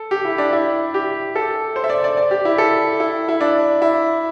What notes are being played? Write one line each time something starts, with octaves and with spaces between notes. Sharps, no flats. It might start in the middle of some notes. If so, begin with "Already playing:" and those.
Already playing: A4
G4
E4
D4
E4
G4
A4
C5
E5
D5
D5
D5
G4
E4
A4
E4
E4
D4
E4